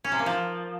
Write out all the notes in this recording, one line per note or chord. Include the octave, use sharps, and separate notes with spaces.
C#4
C3
A#3
F3